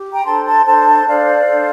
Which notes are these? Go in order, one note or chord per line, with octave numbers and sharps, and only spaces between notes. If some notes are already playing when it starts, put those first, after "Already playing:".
Already playing: G4
G5 A#5
D4 A4 C5 A5 C6
A5 C6
D4 A4 C5 A5 C6
D4 A4 C5 D5 F5
D4 A4 C5